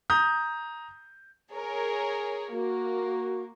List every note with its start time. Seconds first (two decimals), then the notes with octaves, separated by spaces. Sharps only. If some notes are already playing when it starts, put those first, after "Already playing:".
0.10 A#5 D#6 G6
1.51 G#4 A#4 C#5
2.51 A#3 F#4